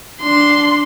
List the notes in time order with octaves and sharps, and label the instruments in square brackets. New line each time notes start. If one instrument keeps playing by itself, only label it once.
[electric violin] D4 C6